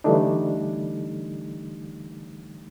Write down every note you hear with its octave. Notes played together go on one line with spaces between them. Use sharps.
D3 E3 G3 A3 D4 D#4